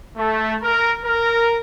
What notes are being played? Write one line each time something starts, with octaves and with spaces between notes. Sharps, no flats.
A3
A#4
A#4